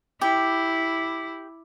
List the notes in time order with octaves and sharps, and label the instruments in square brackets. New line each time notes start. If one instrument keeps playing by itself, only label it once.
[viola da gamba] E4 [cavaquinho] G4